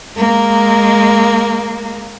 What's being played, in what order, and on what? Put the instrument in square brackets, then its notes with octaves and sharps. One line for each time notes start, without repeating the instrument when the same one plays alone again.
[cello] G#3 A#3